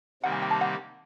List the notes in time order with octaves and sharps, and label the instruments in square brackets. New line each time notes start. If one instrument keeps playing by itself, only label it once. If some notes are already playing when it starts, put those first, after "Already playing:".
[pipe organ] C3 D#3 G3 A#3 [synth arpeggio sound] F#5
[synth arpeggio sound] G#5
G5
A5
F#5